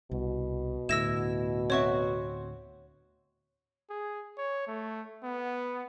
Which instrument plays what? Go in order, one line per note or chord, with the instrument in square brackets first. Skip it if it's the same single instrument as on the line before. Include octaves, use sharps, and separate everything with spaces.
[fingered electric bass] C2 [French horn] B2
[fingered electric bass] D2 A2 [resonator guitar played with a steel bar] E4 [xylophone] E6 A#6 E7
[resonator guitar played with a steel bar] C4 F#4 E5 [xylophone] C#5 C#6
[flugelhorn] G#4
C#5
A3
B3